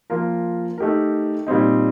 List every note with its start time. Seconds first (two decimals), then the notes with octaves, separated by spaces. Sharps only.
0.10 F3 A#3 F4 A#4
0.78 A3 D#4 G4 A#4
1.47 A#2 G3 C4 D#4